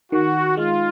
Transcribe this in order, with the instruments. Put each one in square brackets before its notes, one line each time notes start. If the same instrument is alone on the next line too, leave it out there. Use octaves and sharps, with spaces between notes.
[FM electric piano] D#3 [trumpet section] F#4
[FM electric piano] G#3 [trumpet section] F4